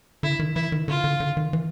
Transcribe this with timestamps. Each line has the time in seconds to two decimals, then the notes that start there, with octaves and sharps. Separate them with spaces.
0.23 D3 E4
0.39 D#3
0.55 E3 E4
0.72 D#3
0.88 D3 F4
1.04 D3
1.20 D3
1.37 D#3
1.53 E3